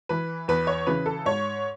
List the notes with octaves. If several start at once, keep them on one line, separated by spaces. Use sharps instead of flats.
E3 B4
E2 B4
C#5
C#3 E3 B4
A4
G#2 C#5